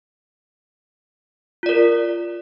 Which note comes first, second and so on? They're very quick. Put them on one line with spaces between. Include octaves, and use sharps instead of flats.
F4 D5 A#4